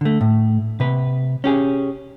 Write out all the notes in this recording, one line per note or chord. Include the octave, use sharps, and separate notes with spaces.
D3 A3
A2
C3 B4
C#4 G4 G#4